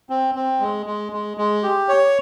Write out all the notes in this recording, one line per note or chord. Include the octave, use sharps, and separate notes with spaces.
C4
C4
G#3
G#3
G#3
G#3
G4
C#5